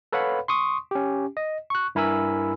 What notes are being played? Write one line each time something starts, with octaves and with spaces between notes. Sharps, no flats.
A4 B4 C#5 F5 F#5 B5
C6 C#6 D#6
C#4 G4
D#5
C#6 F#6
G2 E4 A#4 G#5 B5 E6